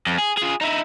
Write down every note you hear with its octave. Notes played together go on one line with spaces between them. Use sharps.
F2
G#4
F4 G#4
D#4 E4